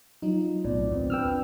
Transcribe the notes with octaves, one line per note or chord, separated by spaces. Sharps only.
F#3 D#4 F4
B1 A2 B3 C4 D5
D#2 C4
D4 B4 G5 E6 F6